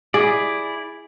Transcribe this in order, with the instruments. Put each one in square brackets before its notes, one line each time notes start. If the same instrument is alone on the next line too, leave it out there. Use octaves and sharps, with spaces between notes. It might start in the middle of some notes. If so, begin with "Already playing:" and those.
[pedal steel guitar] E4 D5 [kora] G#4